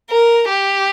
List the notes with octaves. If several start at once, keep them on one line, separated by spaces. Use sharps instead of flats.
A#4
G4